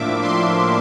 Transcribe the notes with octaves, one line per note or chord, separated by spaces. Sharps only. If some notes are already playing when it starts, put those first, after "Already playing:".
Already playing: A2 F3 A#3 D4 E5 D6
C6